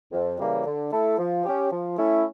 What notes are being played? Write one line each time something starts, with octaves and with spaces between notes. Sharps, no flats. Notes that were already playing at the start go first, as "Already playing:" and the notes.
F2
C#3 E3 G3 A#3
D3
A3 E4 A4
F3
C#4 G4
F3
A3 C#4 E4